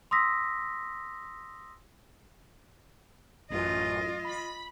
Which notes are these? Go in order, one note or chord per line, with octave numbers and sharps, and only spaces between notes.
C6 D#6 E6 A#6 B6
A1 F#2 F4 D#5
B5